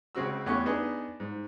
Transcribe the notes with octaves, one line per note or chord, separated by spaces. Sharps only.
C#2 C#3 C4 F#4 E6
E2 A3 C#4 G4 F#5 C#6
B3 D4 D#4 G#4 B4
G#2